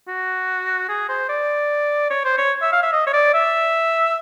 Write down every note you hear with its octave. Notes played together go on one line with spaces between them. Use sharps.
F#4
G#4
C5
D5
C#5
C5
C#5
E5
F5
E5
D#5
C#5
D5
E5